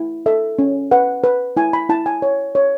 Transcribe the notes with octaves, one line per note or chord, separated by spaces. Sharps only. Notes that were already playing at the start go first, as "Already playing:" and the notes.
Already playing: E4
A4 E5
C#4
B4 F#5
B4
E4 G#5
B5
E4 A5
G#5
C#5
C#5